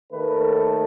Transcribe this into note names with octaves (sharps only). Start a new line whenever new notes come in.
D#2 D#3 A3 B4
A4